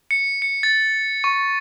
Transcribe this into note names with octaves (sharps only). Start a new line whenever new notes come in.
C#7
C#7
A6
C#6